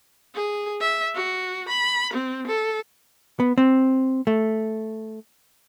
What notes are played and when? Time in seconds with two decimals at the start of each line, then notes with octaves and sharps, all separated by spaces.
0.35 G#4
0.81 E5
1.15 F#4
1.68 B5
2.13 C4
2.47 A4
3.40 B3
3.58 C4
4.27 A3